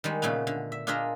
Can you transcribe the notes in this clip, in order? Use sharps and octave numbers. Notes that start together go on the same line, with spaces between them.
D#3 G3 G#3
A#2 C#3 A3 B3
D3
E5
D4 F4 G#4 A#4 D#5 E5